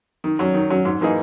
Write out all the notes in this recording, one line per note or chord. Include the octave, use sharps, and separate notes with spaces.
D#3
F#3 C#4
D#3
F#3 C#4
G#2
E3 A#3 D#4 G#4